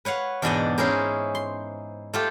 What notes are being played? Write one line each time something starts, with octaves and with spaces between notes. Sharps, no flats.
B4 C#5 F5 F#5
E2 G#2 B2 D4 D5 D#5
C#4 D#4 E4 G#4 A#4 C5
C6
A3 F4 G4